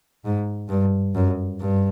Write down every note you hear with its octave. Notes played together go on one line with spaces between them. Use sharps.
G#2
G2
F#2
G2